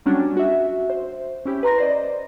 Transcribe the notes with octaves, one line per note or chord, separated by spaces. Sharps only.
F#3 G3 C#4 D4 F#4
F#4 E5
C5
C#4 E4 G4
B4 A#5 C6 A#6
C5 D5 D#5